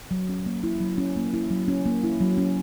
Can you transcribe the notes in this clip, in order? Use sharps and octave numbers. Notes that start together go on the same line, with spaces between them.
F#3
C#4
A#3
E4
F#3
C#4
A#3
E4
F#3
C#4
A#3
E4
F#3
C#4